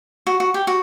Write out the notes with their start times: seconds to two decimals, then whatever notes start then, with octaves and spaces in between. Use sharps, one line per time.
0.27 F#4
0.40 F#4
0.54 G4
0.67 F#4